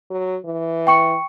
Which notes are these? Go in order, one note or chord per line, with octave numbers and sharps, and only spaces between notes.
F#3
E3
G5 C#6 C#7